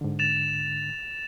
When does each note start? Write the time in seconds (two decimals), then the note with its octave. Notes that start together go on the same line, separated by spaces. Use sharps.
0.01 G#2 D3
0.19 A6 E7 F7